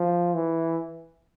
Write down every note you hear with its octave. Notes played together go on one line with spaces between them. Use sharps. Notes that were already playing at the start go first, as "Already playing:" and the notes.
Already playing: F3
E3